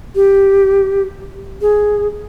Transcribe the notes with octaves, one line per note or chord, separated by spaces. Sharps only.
G4
G#4